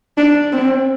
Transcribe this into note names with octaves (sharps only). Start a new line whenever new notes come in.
D4
C4